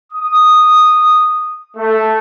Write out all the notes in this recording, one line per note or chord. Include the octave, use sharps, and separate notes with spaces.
D#6
A3